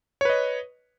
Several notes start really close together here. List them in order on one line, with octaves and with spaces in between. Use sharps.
C#5 B4 D#5